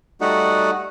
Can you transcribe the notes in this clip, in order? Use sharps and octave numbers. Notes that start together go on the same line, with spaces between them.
G3 A3 D#4 F#4